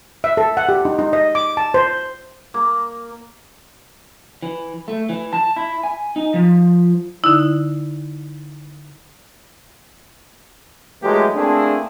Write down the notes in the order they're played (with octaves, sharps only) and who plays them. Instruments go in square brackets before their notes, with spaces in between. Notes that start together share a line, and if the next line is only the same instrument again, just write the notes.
[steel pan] E5
A4
F#5
G4
D#4
D#4
D#5
D6
A5
C5
[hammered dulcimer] A#3
[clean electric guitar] E3
A3
E3
A5
E4
G#5
D#4
F3
[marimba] D3 D#4 E4
[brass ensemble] E3 F#3 G#3 A3 G4
A3 A#3 C4 D4 E4 G#4